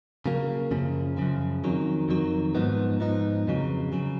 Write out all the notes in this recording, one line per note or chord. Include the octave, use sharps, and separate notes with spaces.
C#3 F#3 A#3
F#2 C#3 F3
F#2 C#3 F3
F2 D#3 F#3
F2 D#3 F#3
G#2 F3 B3 D#4
G#2 F3 B3 D#4
F2 C#3 F#3
C#3 F#3